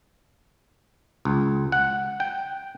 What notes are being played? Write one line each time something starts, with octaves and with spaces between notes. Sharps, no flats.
C#2
F#5
G5